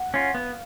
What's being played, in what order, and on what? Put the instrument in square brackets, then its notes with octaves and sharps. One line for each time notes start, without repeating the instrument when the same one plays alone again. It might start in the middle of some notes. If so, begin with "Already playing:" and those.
Already playing: [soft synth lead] F#5
[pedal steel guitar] C#4 F4
[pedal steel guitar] B3 [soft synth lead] F5